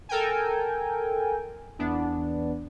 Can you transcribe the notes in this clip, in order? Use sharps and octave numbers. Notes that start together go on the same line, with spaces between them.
A4 A#4 G5 G#5
E2 B3 D4